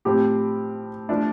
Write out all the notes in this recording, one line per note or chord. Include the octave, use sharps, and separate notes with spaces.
A2 F3 C4 G4
F3 A3 D4